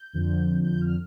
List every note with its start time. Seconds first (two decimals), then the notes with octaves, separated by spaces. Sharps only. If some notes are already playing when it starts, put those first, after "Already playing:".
Already playing: G6
0.13 F2 D3 F3
0.64 G6
0.81 F6